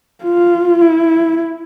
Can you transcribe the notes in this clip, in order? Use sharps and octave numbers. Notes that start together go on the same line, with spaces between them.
F4
E4